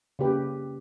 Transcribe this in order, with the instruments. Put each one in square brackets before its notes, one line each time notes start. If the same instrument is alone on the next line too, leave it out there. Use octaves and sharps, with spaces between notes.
[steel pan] C#3 A#3 G4 B4